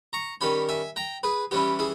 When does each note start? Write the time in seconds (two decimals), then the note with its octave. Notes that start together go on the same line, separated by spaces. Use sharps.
0.13 A#5 C#6
0.41 D#3 G3 C#4 G#5 B5
0.69 E5 G#5
0.96 G5 A#5
1.23 G#4 B4
1.51 E3 G3 C#4 E4 G4
1.79 E4 G#4